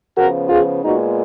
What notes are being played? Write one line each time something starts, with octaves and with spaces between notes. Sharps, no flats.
C#3 F3 B3 F#4 A#4
F4 G#4
A#2 G#3 B3 D#4 F#4